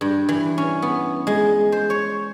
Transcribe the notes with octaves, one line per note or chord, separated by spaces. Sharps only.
G2
E3
C#4
B3
G#3
C5
C#5